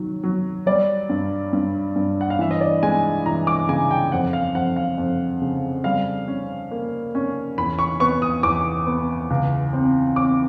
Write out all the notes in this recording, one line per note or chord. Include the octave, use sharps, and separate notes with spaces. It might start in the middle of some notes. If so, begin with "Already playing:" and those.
Already playing: D#3 F#3
F#3
G3 D5
G2
G2
G2
F#5
F5
E3 E5
D#5
D5
G#3 G#5
E3 A#5
D6
C#3 G#5
G5
F2 F#5
F5
F2 F#5
F5
F2
C#3
G3 F5
C#4
A#3
C#4
E2 B5
C#6
B3 C#6
D#6
E2 D6
B3
C#2
C4
C4 D6